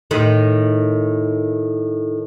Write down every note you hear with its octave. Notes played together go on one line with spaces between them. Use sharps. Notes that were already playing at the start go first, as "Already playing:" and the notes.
A2 D#3